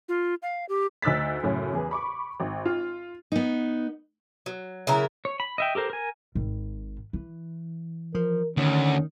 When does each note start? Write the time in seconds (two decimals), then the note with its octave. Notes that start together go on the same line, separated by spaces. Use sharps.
0.09 F4
0.42 F5
0.69 G4
1.02 D2 D#4 E6 F#6 A6 B6
1.43 F#2 A2 C#3 C#4
1.73 E2 G#4 B4
1.91 B5 C#6 D6
2.40 G#1
2.66 F4
3.32 B3 D#4
4.46 F#3
4.87 C#3 F#3 E4 A#4
5.25 C#5
5.40 B5
5.58 D#5 E5 G5
5.75 G4 A4 A#4 C5
5.90 A#4 G#5
6.35 G#1
7.13 E3
8.15 F3 A#4
8.57 D2 D#3 C#4